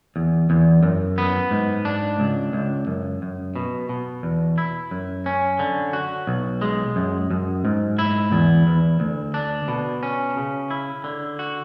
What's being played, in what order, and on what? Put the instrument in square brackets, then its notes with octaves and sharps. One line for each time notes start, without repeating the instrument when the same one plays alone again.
[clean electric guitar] E2
E2
F#2
B3
G#2
D4
C#2
C#2
F#2
F#2
B2
B2
E2
E4
F#2
C#4
D3
F#4
B1
G#3
F#2
F#2
G#2
E4
E2
E2
D2
D4
B2
C#4
C#3
E4
D3
F#4